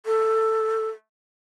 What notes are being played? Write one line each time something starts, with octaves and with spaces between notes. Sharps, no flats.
A4